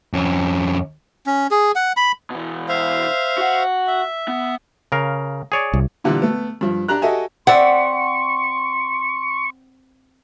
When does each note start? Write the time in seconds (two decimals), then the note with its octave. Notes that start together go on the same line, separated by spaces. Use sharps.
0.13 F2 C#4
1.26 C#4
1.51 G#4
1.75 F#5
1.97 B5
2.30 B2 E3
2.69 C5 E5 F5
3.38 F#4 F#5
3.87 E5
4.28 B3
4.92 C#3 A#4 F5
5.52 G#4 C#5 D5
5.74 C2
6.04 A#2 D3 E3 G3 F4
6.22 A3 B3
6.61 G2 F3
6.88 D4 G4 A#5 F#6
7.02 F#4 G4 A4 D#5 E5 G#5
7.47 C4 D5 E5 F#5 C6 C#6